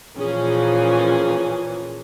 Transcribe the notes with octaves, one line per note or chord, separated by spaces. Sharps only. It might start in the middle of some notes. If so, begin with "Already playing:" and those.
A#2 E3 F3 C#4 G#4